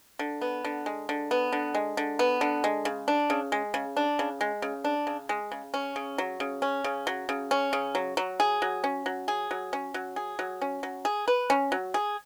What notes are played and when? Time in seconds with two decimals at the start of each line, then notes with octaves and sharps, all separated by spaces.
0.19 D3
0.41 B3
0.65 D3
0.86 G#3
1.09 D3
1.31 B3
1.52 D3
1.74 G#3
1.97 D3
2.19 B3
2.41 D3
2.64 G#3
2.85 C#3
3.08 D4
3.30 C#3
3.52 G#3
3.74 C#3
3.97 D4
4.19 C#3
4.41 G#3
4.62 C#3
4.84 D4
5.07 C#3
5.29 G#3
5.52 C#3
5.74 C#4
5.96 C#3
6.18 F#3
6.40 C#3
6.62 C#4
6.84 C#3
7.07 F#3
7.29 C#3
7.51 C#4
7.73 C#3
7.95 F#3
8.17 F#3
8.40 G#4
8.62 F#3
8.84 C#4
9.06 F#3
9.28 G#4
9.51 F#3
9.73 C#4
9.94 F#3
10.16 G#4
10.39 F#3
10.61 C#4
10.83 F#3
11.05 G#4
11.28 B4
11.50 C#4
11.72 F#3
11.94 G#4